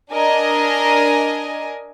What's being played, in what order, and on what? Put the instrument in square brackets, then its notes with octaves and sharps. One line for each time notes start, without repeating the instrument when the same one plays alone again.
[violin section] D4 A#4 D#5 G#5